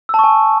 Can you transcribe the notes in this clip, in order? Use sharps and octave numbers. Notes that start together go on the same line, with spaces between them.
G#5 A5 C#6 E6